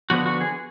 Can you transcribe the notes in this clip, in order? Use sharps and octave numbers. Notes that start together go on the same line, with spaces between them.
D3 F3 B3 F#4
F#4
G#4